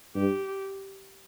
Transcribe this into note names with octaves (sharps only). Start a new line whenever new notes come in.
G2 G4